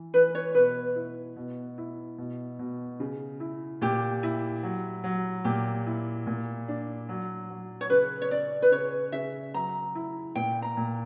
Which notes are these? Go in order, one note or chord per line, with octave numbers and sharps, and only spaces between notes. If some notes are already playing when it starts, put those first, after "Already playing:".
Already playing: E3
E3 B4
C#5
B2 B4
E4
B2
E4
B2
B2
C#3
E4
A#2 G4
E4
F#3
F#3
A#2 G4
E4
A#2
D4
F#3
F#3
C#5
C#3 B4
C#5
C#4 D5
B4
C#3 C#5
C#3 E5
F#3 A#5
E4
A#2 G5
A#5
A#2